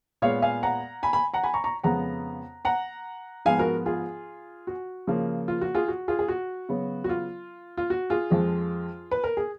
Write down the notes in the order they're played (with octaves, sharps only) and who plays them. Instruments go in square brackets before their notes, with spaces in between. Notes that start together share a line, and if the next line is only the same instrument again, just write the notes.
[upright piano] A#2 G#3 B3 C#5 F5
F5 G#5
F#5 A#5
G#5 B5
G#5 B5
F#5 A#5
G#5 B5
A#5 C#6
A#5 C#6
F2 C#3 G#3 B3 F#5 A#5
F#5 A#5
G#2 F3 G#3 B3 F5 G#5
F#4 A#4
F4 G#4
F#4
C#3 F3 A#3
F4
F#4
F4 G#4
F#4
F4 G#4
G#4
F#4
C#3 F#3 B3
F#4
F4
F4
F#4
F4 G#4
F2 F3 G#3
B4
A#4
G#4